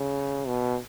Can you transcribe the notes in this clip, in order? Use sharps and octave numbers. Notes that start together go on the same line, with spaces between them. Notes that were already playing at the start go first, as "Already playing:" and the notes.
Already playing: C#3
B2